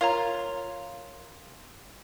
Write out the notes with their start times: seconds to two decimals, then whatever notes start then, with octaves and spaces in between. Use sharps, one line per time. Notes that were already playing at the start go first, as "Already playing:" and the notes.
0.01 F4 A#4 C#5 A#5